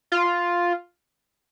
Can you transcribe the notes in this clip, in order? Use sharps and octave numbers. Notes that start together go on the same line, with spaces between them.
F4